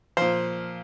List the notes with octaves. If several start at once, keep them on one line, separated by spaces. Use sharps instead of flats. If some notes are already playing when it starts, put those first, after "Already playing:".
A#2 F3 C5